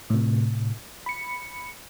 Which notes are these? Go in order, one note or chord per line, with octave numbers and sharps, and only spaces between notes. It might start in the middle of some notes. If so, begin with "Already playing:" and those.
A2 C3
B5 C#7